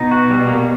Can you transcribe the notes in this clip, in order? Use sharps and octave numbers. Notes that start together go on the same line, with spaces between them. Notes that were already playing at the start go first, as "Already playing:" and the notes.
Already playing: B2 D#4
F#4
G3
A#3